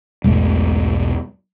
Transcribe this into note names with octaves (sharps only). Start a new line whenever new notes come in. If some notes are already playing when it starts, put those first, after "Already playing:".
E1 B1 G#2 G#3 A3